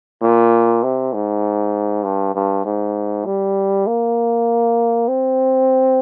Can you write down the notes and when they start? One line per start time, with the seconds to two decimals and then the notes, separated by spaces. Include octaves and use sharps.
0.22 A#2
0.83 C3
1.13 G#2
2.04 G2
2.35 G2
2.65 G#2
3.26 G3
3.87 A#3
5.08 C4